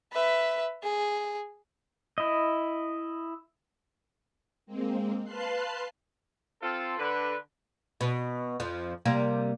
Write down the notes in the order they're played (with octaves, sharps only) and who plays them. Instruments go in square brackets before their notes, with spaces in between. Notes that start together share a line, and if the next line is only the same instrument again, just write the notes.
[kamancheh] B4 E5
G#4
[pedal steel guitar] E4 D#5
[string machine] G#3 A#3 C4
B4 F5 A5 C6 F#6 C7
[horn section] C4 F4 A4
D3 B4
[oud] B2
F2 F3
C3 G3 A#3